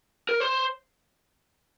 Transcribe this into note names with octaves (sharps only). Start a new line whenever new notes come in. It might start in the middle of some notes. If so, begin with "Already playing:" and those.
A#4
C5